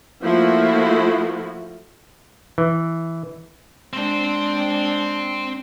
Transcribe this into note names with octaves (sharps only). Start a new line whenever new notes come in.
F3 A3 A#3 E4 F#4
E3
G#3 C4 D4 C5